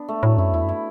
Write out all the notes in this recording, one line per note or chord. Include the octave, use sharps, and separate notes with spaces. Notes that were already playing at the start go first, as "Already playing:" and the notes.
Already playing: B3 D4
A3
A2 F#3
F#2 E4
E2 E4
F#2
E4